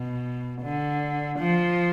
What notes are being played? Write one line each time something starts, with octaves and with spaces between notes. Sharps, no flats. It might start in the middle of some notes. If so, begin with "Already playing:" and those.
Already playing: B2
D3
F3